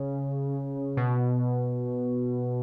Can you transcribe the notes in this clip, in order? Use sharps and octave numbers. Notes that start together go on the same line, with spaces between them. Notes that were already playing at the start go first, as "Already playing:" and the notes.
Already playing: C#3
B2